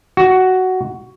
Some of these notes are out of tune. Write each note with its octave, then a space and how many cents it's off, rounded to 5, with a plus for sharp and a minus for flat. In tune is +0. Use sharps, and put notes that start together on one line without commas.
F#4 +10